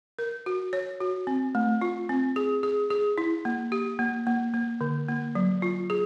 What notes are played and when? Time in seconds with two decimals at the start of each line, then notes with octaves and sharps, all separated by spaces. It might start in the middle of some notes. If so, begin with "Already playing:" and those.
0.19 A#4
0.46 F#4
0.73 C#5
1.01 F#4
1.27 C4
1.55 A3
1.81 F4
2.09 C4
2.36 G#4
2.63 G#4
2.90 G#4
3.18 E4
3.45 A#3
3.72 G4
3.99 A#3
4.27 A#3
4.54 A#3
4.81 D3
5.08 A#3
5.35 F#3
5.62 F4
5.90 G#4